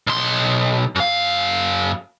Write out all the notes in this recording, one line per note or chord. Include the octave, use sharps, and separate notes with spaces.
B1 C6
F#2 F5